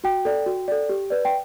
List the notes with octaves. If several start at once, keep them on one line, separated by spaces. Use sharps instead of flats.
F#4 G5
A4 D5
F#4
A4 D5
G4
B4 D5
G5